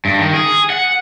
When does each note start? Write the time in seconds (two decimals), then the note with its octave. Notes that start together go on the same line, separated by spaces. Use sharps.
0.05 G2
0.19 D#3
0.34 G#4
0.70 F#5